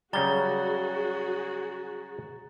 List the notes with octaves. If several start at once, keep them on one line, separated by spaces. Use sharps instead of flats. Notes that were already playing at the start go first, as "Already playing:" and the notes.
C#3 F#3 G3 F#4 G#4 A#5 A6 G7